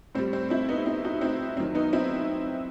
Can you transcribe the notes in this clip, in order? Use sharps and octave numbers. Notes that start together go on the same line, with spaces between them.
A2 G3 C4
C4
C4 E4
B3 D#4
C4 E4
D#4 F#4
C4 E4
F#2 D#3 F#3 C4
B3 D#4
C4 E4